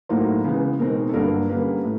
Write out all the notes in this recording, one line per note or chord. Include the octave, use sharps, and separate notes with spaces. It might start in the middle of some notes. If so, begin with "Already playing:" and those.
A2 F#3 A#3 D#4 C5
C#3 E3 G#3 B3
B2 G#3 C4 D#4 A#4
A4
G2 D3 F#3 A#3 D4 A#4
D3 G3 A#3 C#4 B4
A2